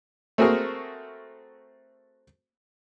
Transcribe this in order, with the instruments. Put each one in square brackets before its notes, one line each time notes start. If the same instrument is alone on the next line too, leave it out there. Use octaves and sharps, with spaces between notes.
[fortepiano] A3 C4 F#4 G#4 A#4